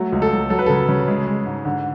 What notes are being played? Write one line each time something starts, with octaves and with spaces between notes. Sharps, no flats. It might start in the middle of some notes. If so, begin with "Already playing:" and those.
Already playing: F#3 A3
C#2
A4
F#3
F#3 A4
B4
C#3 A4
C#3
G#3
G#3
G#2
D3